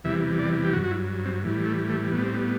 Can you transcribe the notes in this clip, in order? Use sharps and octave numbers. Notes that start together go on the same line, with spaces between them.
E2 C3 E3 G3 E5
D5
G4
G2 F#3 F#4
F#4
E4
C4
A2 E3 G3
A3
A3
A2 G3 B3
C4
B3